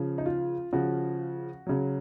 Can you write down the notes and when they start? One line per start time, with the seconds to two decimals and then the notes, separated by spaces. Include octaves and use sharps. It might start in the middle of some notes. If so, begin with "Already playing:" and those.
Already playing: C#3 F3
0.18 D#4
0.26 F4
0.73 C#3 F3 F#4
1.67 C#3 F#3